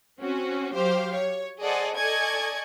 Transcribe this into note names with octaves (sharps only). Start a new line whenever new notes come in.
C4 C#4 F#4
F#3 G4 C5 F5
C#5
G#4 A4 C5 D5 D#5 F#5
A4 D5 D#5 G#5 C#6 G#6